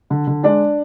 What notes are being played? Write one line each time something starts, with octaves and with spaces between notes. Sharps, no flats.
D3
D3
G#3 D4 D5